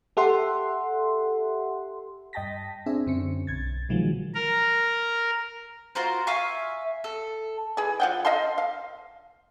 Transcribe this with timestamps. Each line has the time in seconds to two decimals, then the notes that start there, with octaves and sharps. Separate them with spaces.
0.17 G4 A4 E5 F#5 C6
2.33 G2 D#5 G5 A5 A#6 B6
2.86 C4 D4 G#4 E5
3.06 F#2 D3 C4 C#4 C#7
3.47 B1 G#6 A6
3.89 B2 D3 D#3 F3 F#3 G#3
4.35 A#4
5.95 F4 F#4 A#4 C5
6.27 E5 F5 G#5 C#6
7.04 A4
7.77 E3 G#4
8.00 F3 F#5 G5
8.25 D#5 F5 A5 C6
8.58 F5